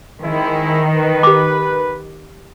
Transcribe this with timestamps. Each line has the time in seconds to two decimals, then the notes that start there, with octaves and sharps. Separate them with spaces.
0.24 D#3 G#3 C4 E4
0.95 B4
1.23 G4 D6